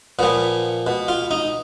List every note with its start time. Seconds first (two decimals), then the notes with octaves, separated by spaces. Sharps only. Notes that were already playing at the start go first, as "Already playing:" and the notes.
0.19 A#2 F3 B3
0.87 B2
1.08 F4
1.31 D#4